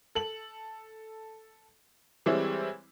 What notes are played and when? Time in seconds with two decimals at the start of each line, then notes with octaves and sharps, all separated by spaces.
0.15 A4 F#7
2.26 E3 G3 G#3 C4 E4 C#5